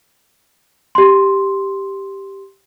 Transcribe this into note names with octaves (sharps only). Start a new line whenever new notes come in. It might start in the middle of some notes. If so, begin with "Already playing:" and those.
G4 C6